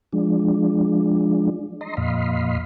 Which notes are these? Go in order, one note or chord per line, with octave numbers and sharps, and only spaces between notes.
F3 G#3 D4
D#5 A#5 C6
F2 A#2 D#5 F5 B5 C6